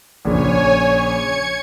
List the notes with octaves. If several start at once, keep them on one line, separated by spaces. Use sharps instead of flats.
A#1 C#3 C#5 G#5
G#6 C#7